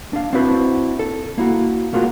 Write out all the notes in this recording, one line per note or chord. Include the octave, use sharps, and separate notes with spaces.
D4 F5
C4 D4 E4 F#4 B4 C5
A4
A#3 E4 F#4
A3 A#3 F4 F#4 G#4